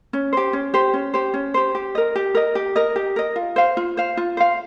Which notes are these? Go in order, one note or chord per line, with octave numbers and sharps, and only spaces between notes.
C#4
G4 C5
C#4
G4 C5
C#4
G4 C5
C#4
G4 C5
G4
A#4 D#5
G4
A#4 D#5
G4
A#4 D#5
G4
A#4 D#5
F4
C5 F5
F4
C5 F5
F4
C5 F5